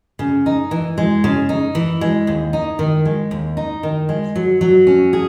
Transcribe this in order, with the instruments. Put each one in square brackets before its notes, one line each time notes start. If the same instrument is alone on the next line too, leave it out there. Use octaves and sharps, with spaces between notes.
[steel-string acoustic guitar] C#3
D#4
E3
G#3
C#3
D#4
E3
G#3
D#2
D#4
D#3
G#3
D#2
D#4
D#3
G#3
F#3
F#3
C#4
G#4